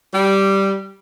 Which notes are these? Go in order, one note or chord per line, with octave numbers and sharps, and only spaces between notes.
G3